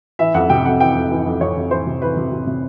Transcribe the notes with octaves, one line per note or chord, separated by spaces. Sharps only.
E3 E5
F2 F#5
C3 G5
F2 F#5
E3 G5
F2
E3
F2
F2 C#5
F2
E3 C5
C3
E3 B4
C3
C3
C3